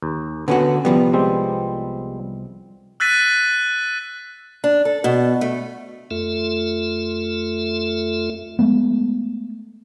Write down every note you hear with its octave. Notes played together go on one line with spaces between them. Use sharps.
D#2
D3 B3 C#4 F#4
C2 F3 G3 B3
G3 G#3 C4
E6 F#6 A6 B6 D#7
D4
A4
B2
A3
F2 A3 F4 A4 E5
G#3 A3 B3